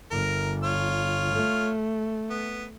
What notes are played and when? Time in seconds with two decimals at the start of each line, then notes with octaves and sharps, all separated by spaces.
0.11 G1 A#4
0.64 F4 C#5 F6
1.33 A3
2.30 B3